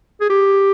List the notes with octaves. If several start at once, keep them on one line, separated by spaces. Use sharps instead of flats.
G#4
G4